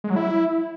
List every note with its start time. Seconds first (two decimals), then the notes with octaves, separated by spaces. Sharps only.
0.04 G#3
0.10 F#3
0.16 E4